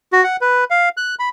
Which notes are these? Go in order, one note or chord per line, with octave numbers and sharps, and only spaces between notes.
F#4
F#5
B4
F5
F#6
B5